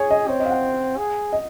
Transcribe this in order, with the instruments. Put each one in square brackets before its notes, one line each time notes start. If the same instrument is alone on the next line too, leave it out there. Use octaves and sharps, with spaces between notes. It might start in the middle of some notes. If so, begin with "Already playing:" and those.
Already playing: [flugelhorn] G#4 [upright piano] C#5
[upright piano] D#5
[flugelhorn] C4 [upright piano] C#5
[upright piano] D#5
F5
F#5
[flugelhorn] G#4
[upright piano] D#5